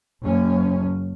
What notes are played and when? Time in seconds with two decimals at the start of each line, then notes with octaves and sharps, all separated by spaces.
0.23 F#1 C#4